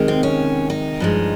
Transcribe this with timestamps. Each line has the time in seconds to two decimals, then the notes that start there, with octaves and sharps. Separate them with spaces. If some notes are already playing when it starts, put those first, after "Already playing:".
Already playing: C3 D#3 G#3
0.08 C4
0.23 C#4
0.70 D#4
1.00 G2 F3 G#3